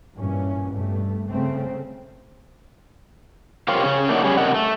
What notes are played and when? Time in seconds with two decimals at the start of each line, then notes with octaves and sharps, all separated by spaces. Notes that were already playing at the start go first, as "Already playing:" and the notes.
0.16 G2 A#2 E3 C#4
0.72 G2 B2 A3
1.29 C#3 A3 C4
3.68 F4 G4 A#4 C5 C#5 F5
3.83 C#3 C#4
4.09 A3 A#3 D4 D#4 F#4
4.24 F#3 G3 C#4 G#4
4.37 C3 D4 A#4 D#5 F#5
4.54 A3